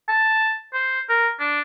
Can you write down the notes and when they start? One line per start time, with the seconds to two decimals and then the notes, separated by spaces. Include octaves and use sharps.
0.08 A5
0.74 C5
1.09 A#4
1.39 D4